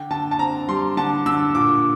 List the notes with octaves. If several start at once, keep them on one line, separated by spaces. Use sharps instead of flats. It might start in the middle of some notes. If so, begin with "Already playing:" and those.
Already playing: D3 G5
D3 A5
A5
C4 A#5
G3 C6
D3 A5
D3 E6
A#2 D6